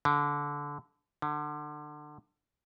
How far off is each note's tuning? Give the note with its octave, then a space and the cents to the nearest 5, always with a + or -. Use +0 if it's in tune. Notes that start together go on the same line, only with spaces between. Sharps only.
D3 -20
D3 +25